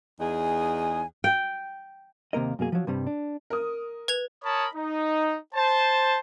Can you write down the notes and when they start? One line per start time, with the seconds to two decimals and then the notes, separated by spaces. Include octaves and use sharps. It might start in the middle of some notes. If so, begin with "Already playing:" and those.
0.21 E2 D#4 G#4 G#5
1.24 G5
2.33 D#2 C3 A#3 A#4 D#5
2.59 F#2 B2 A#3 G#4
2.72 F3 F#3
2.87 G2 C3 G3
3.07 D4
3.50 A#4 D#6
4.08 B4 G#6 F7
4.44 A#4 C#5 A5 B5 D#6
4.75 D#4
5.55 C5 A5